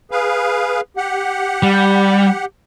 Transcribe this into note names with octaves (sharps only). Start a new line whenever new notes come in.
G#4 B4 F5
G4 F#5
G3